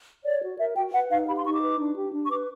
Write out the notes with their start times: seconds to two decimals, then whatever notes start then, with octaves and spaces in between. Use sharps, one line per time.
0.24 C#5 D5
0.42 F#4
0.58 A#4 E5
0.75 F#4 G5
0.93 B4 F#5
1.10 D#4 F5
1.27 G4 B5
1.36 C6
1.44 D#4 C#6
1.53 D6
1.61 B4
1.78 D4
1.95 G4
2.12 D4
2.25 C#6
2.29 B4 D6